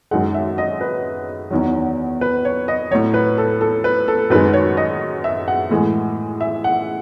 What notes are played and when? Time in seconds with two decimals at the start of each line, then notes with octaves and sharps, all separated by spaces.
0.11 F#2 D#3 G#3 F#5
0.34 E5
0.58 D#5
0.81 B4
1.50 E2 D#3 F#3
2.21 B4
2.45 C#5
2.68 D#5
2.91 F#3 C#5
2.95 A2
3.14 B4
3.38 A4
3.61 A4
3.84 B4
4.08 A4
4.30 F#2 D#3 G#3 B4
4.53 C#5
4.77 D#5
5.24 E5
5.48 F#5
5.71 A2 E3 G#3
6.41 E5
6.64 F#5